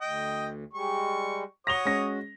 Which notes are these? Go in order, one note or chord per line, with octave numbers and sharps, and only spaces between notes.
D2 D#5 G5
G3 G#3 C#6
F#4 C#5 D#6 A#6 F7 G7
G#3 C#4 A#6